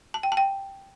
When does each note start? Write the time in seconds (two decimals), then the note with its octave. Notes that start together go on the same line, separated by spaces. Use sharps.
0.14 A5
0.23 G5
0.32 A5
0.37 G5